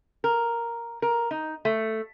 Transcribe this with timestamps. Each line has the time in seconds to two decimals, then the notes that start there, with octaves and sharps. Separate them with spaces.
0.24 A#4
1.02 A#4
1.31 D#4
1.65 A3